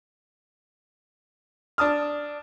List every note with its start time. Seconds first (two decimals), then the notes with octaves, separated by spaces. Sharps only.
1.78 D4 A5 D#6 F6